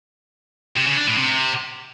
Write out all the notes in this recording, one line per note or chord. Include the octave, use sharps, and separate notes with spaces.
C3
C#3
D4
A2
C3